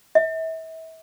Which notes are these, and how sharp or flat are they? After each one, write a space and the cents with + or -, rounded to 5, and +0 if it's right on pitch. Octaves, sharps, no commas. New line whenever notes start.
E5 -35